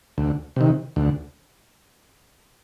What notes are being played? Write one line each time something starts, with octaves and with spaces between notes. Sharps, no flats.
D2
C3 D#3
D2